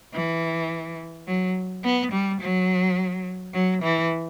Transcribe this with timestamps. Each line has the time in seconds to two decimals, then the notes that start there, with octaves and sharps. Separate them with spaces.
0.14 E3
1.27 F#3
1.84 B3
2.12 G3
2.41 F#3
3.54 F#3
3.82 E3